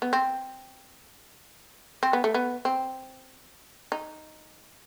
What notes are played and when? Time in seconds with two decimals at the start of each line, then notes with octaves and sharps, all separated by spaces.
0.02 B3
0.13 C4
2.03 C4
2.13 B3
2.24 A3
2.34 B3
2.65 C4
3.92 D#4